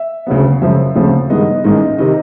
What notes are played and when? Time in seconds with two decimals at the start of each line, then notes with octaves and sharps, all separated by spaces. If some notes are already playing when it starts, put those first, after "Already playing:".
Already playing: E5
0.27 D2 C#3 F#3 B3
0.62 F#2 C#3 F3 G#3 E5
0.95 D2 C#3 F3 A3 C4
1.30 G2 D#3 G#3 B3 D#5
1.64 A1 G#2 D#3 G#3 D#5
1.98 C3 D#3 D#5